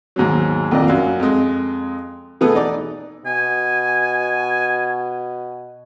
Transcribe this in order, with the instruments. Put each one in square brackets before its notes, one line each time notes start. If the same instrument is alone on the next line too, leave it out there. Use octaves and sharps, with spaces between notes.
[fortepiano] D#2 G#2 B2 F#3
A#1 F2 D#3 F3 D5 D#5
F#2 F#4 F5
F2 G#3
B2 E3 A3 B3 G#4 A4
D#4 D5 D6
[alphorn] B2 [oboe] G#5